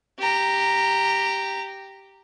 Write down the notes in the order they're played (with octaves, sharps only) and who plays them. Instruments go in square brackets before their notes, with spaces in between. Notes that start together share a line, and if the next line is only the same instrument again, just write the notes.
[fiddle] G4 A#5